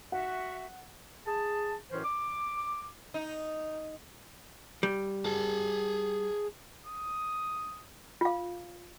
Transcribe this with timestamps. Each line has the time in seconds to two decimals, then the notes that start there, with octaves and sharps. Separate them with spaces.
0.12 F#4 E5 F#5
1.26 G#4 A5
1.91 F#2 A2 E3 C#4 C5
2.03 D6
3.14 D#4
4.83 G3
5.26 G#4 A5
6.86 D#6
8.21 F4 F5